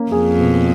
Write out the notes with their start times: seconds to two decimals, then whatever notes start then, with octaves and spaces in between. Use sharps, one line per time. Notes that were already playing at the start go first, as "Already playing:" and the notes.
Already playing: A#3 C#4
0.12 F2 G#4
0.39 B2